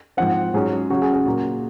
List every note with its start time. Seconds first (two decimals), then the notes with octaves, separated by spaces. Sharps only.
0.17 G#2 F3 C4 F#5
0.54 G#2 F#3 C#4 G#4
0.90 C#3 F#3 C#4 F#4
1.02 G#4
1.13 G#4
1.26 A#2 F#3 A#3 F#4